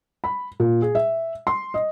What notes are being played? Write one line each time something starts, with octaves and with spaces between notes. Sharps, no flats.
B5
A#2
G#4
E5
C6
D#5